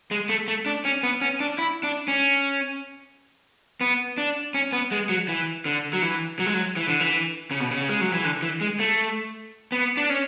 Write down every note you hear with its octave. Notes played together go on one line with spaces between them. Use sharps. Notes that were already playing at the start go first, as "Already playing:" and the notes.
G#3
A3
A3
D4
C#4
B3
C#4
D4
E4
D4
C#4
B3
D4
C#4
B3
G#3
F#3
E3
D3
F#3
E3
F#3
G#3
F#3
E3
D3
E3
C#3
B2
C#3
G#3
F#3
E3
D3
E3
G#3
A3
B3
D4
C#4